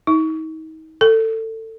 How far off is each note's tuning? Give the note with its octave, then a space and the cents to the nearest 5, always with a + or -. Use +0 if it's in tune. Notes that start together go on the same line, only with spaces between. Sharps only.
D#4 +35
A4 +25